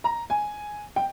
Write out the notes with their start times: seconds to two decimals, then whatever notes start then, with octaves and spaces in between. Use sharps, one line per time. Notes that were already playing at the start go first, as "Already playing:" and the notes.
0.04 A#5
0.30 G#5
0.96 G5